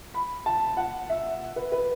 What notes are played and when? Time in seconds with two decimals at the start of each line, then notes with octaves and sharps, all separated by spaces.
0.14 B5
0.46 A5
0.77 F#5
1.10 E5
1.56 B4
1.72 B4